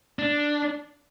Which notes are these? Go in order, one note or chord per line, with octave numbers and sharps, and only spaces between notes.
D4